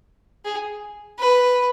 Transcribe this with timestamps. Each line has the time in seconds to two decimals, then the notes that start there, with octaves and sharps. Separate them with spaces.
0.44 G#4
1.19 B4